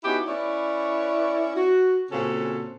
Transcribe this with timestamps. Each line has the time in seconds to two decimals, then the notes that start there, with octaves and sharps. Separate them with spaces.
0.04 B3 C#4 D#4 E4 F#4 G4
0.27 C#4 E4 B4 C#5 D5
1.56 F#4
2.11 A#2 C#3 C4 C#4 F#4 A4